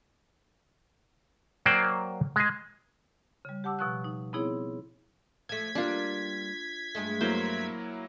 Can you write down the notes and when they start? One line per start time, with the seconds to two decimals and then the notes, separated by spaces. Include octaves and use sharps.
1.66 F#3 A#3 C5 D5 G5
2.36 G#3 G#4
3.45 C#3 G3
3.64 G4 F#5 A5 D6 E6
3.79 B2 F3 C#6 E6 F#6
4.04 D#4
4.33 B3 C4 D#4 E4 G#4 C#5
5.49 F3 A3 G#6 B6
5.75 G3 A#3 D4 F4
6.95 G2 G#3 A3
7.21 F#3 A#3 E4 C5